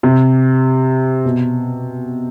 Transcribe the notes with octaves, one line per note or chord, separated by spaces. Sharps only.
C3
B2